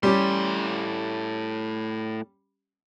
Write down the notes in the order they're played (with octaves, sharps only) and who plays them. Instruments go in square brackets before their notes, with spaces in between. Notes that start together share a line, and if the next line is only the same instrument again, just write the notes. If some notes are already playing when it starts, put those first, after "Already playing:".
[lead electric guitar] A2 C6 [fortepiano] G3 C#4 G4